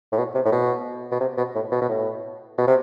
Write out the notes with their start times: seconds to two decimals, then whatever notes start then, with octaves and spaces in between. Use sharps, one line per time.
0.12 A2
0.18 B2
0.35 C3
0.45 A2
0.52 B2
1.12 B2
1.20 C3
1.37 B2
1.55 A2
1.72 B2
1.82 B2
1.89 A2
2.58 B2
2.67 C3